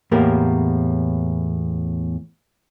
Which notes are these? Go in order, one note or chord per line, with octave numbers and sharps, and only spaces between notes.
E2 A2 A#3 G4 A#4